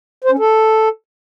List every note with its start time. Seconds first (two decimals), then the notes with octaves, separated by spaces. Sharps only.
0.24 C5
0.32 C#4
0.39 A4